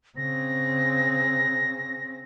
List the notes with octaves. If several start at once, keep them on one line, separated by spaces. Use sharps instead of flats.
C#3 C4 A#6